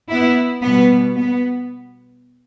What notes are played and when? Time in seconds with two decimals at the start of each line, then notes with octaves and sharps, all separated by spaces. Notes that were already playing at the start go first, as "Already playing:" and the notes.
0.09 B3 E4
0.62 B2 G3 B3
1.16 B3